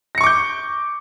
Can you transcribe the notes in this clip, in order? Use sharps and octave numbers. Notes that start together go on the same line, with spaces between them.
C#6 D6 G6 A#6 C#7